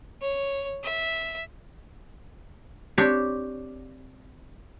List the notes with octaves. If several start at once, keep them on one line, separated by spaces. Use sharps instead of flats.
C#5
E5
C4 D4 G4 C#5